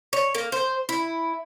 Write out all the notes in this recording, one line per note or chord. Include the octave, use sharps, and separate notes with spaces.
C#5
A#3
C5
E4